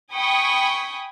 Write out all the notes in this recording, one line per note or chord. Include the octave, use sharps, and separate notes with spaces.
G5 G#5 B5 C#6 D#6